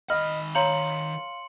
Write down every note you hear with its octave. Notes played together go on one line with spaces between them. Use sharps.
D#3 D#5 B5 F6
C#5 F5 A#5 C6 G6 C#7 F#7